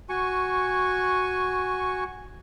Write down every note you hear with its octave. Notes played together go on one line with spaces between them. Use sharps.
F#4 G#5 C#6